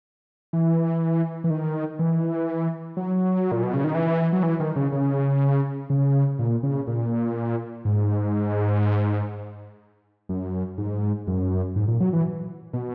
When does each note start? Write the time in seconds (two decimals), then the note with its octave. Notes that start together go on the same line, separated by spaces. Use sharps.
0.53 E3
1.44 E3
1.50 D#3
1.99 E3
2.97 F#3
3.52 A#2
3.63 B2
3.73 C#3
3.84 D#3
3.95 E3
4.33 F#3
4.43 E3
4.60 D#3
4.76 C#3
4.92 C#3
5.90 C#3
6.39 A#2
6.63 C#3
6.87 A#2
7.85 G#2
10.29 F#2
10.78 G#2
11.27 F#2
11.76 G#2
11.88 A#2
12.00 F#3
12.13 E3
12.73 B2